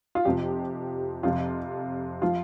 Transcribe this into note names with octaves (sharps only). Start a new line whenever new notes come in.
F4
F2 C3 F3 G4
F2 C3 F3 F4
F3 F4